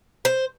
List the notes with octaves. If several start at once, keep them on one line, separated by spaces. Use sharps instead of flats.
C5